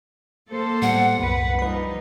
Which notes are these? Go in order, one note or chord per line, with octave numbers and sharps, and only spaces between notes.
A#3 A4 C5
A2 G3 B3 F#5
C2 F#2 B4
F3 G3 D#4 B4 B5